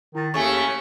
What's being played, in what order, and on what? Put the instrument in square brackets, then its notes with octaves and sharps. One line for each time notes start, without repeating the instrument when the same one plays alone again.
[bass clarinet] D#3 [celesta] E4 A6
[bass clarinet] D#2 [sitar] C#3 A3 [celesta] G#5 C#6